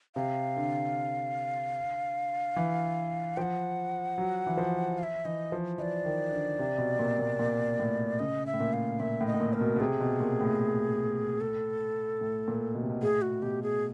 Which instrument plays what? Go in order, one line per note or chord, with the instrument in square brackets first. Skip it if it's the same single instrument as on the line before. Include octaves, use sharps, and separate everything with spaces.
[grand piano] C3 [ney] F5
[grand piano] D3
E3
[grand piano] F3 [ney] F#5 G5
[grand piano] F#3
E3
F3
[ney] F5
E5
[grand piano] E3 [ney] D#5
[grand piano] F3
[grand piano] E3 [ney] D#5
[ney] D5
[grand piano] D#3
D3
C3
B2
A#2
A#2
A#2
A2
[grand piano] C#3 [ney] D#5
[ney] E5
[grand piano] A2
A#2
[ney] F5
[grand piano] A#2 [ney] E5
[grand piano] A2
[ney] D#5
[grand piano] A2
A#2
[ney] A#4
[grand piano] B2
B2
[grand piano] C3 [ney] G#4
[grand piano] B2
A#2
A2
[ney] A4
[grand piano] A2
A#2
B2
C3
B2
[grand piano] A2 [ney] G#4
[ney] F#4
[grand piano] B2 [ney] G4
[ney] G#4